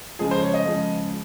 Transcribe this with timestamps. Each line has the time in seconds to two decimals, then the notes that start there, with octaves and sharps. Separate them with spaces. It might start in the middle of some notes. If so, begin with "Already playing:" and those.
0.19 C#3 F3 G#3 G#4
0.31 C5
0.43 C#5
0.54 D#5
0.65 C#3 F3 G#3